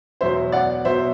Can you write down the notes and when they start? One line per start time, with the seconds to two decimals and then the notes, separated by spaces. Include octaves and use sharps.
0.21 E2 B2 F#3 C5 E5
0.52 D5 F#5
0.84 B2 F#3 C5 E5